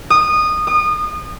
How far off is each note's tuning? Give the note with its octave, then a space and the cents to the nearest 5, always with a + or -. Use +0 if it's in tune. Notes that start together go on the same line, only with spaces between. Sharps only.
D#6 -20
D#6 -30